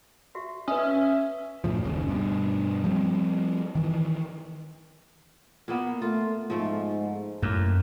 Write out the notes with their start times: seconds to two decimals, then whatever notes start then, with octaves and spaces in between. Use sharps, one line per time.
0.35 F#4 G4 E5
0.68 C#4 B4 D#5 E5 D#6
1.64 G1 D2 A2 F3
1.84 F#1 D#2 C#3
2.09 G2 B2
2.84 F3 G3 A#3 C4
3.75 D#3 E3
5.68 A#2 A#3 B3
6.02 A3 F4
6.50 G#2 F3 A3
7.42 F#2 A2 A#3